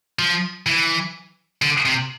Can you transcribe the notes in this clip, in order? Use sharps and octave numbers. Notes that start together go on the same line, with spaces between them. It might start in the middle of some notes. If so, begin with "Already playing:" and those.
F3
E3
D3
C3